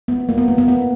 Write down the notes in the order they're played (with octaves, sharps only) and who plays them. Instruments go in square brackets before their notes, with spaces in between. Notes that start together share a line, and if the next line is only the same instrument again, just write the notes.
[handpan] B3
A#3
B3
A#3
B3
B3